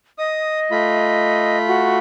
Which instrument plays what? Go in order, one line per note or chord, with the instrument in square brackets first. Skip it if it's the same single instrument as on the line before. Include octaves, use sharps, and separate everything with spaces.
[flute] D#5 [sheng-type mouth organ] D#6
[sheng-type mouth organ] A3 F4 B5
[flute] F#4